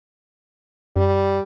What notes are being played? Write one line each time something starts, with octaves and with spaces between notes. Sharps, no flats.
F#2 G3